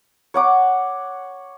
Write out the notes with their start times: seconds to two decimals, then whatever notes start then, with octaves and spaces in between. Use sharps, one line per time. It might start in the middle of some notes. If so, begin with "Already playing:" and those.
0.34 C#5 F#5 D6